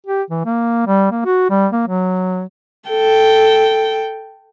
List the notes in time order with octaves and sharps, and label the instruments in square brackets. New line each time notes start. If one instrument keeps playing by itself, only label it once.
[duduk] G4
E3
A#3
G3
A#3
F#4
G3
A#3
F#3
[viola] A4 G5